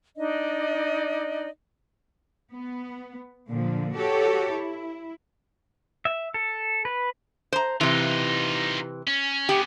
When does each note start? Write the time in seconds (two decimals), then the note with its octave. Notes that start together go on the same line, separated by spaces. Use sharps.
0.17 D4 D#4 D5 D#5
2.52 B3
3.48 A#2 D3 F3
3.94 F#4 G4 A4 C#5
4.49 E4
6.05 E5
6.34 A4
6.85 B4
7.52 C5 A#5
7.81 C3 E3 D#4 F4
9.07 C#4
9.49 B3 C#4 G4